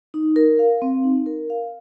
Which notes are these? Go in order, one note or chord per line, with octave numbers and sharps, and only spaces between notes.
D#4
A#4
F5
C4
D#4
A#4
F5